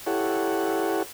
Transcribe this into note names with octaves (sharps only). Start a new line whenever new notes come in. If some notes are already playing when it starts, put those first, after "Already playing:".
E4 G4 A4 C#5 F#5